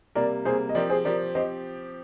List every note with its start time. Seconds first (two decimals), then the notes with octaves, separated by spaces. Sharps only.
0.15 C3 G3 A#3 A#4 D5
0.45 C3 G3 A#3 G#4 C5
0.69 D#5
0.75 F3 C4 G4 A#4 D5
0.90 G#4 C5
1.05 F3 C4 G4 A#4 D5
1.35 F3 C4 G4 C5 D#5